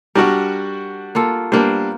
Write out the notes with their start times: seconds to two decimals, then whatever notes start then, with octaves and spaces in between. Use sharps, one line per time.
0.15 G3 D4 F#4 A#4
1.15 A#3 F4 A4
1.52 G3 A#3 B3 D4 C5